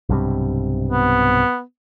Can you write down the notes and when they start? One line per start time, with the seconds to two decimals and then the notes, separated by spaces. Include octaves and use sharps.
0.09 B1 G2 C3
0.89 B3